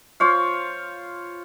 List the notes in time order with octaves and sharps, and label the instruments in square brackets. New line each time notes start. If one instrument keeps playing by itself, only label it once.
[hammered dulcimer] F4 C5 C#5 F5